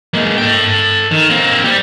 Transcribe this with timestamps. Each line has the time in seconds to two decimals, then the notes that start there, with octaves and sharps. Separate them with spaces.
0.14 G#3 A#3
0.38 A4 G5
1.11 D#3
1.30 A#3 C4
1.64 G3 G4